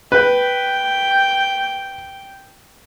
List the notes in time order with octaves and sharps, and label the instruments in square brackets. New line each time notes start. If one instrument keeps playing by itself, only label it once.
[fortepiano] B4 [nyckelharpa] G5